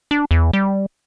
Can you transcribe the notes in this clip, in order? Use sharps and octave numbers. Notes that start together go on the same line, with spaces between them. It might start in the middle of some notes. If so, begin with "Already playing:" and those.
D4
E2
G3